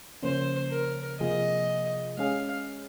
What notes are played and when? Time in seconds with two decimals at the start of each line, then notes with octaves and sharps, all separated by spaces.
0.23 C#3 F3 A#3 C#4 C5
0.71 A#4
1.20 C3 F3 A#3 F4 G#4 D#5
2.18 G#3 C#4 G#4 F5